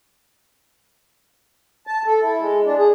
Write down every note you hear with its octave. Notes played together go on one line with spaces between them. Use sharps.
A5
A4
E4
G#3
D4
G#4